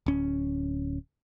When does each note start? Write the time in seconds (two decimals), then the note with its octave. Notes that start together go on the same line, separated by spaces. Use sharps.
0.06 D1 C#4